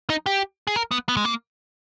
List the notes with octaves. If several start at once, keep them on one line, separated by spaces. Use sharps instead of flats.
D#4
G4
G#4
A#4
B3
B3
G#3
A#3